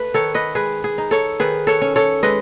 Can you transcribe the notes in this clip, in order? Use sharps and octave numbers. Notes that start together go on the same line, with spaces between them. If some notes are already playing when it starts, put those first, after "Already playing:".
Already playing: A3 B4
D#3 A4 C#5
B4 D#5
G#3 G#4 B4
G#4
D#4
A4 C#5
D#3 G#4 B4
A4 C#5
C#4
A4 C#5
G#3 B4 D#5